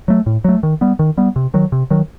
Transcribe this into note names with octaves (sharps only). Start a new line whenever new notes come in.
F#3 A3
A2
F#3 A3
D#3
G3 B3
D#3
G3 B3
C3
D#3 F#3
C3
D#3 F#3